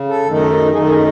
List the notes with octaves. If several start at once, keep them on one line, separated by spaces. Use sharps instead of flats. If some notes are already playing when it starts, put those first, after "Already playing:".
Already playing: C#3
A4
F#2 D#3 A3 D#4
F#2 D#3 A3 D#4 G#4
G#4